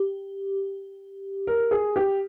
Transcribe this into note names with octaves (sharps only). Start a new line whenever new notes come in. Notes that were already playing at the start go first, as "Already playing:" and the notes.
Already playing: G4
A#4
G#4
G4